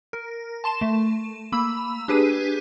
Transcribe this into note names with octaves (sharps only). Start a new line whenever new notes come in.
A#4
A5 C6 E7
A3
A#3 B5 E6
D4 G4 G#4 B4 D#7